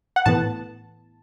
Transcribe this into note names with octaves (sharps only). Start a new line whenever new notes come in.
F#5
A2 E3 B3 A5